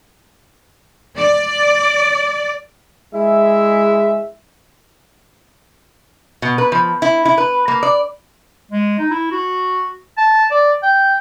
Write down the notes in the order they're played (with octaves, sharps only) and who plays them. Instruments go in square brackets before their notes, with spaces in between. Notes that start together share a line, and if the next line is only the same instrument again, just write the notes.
[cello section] D5
[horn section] G#3 E4 E5
[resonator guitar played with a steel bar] B2
B4
F3
E4
E4
B4
A#3
D5
[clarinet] G#3
D#4
E4
F#4
A5
D5
G5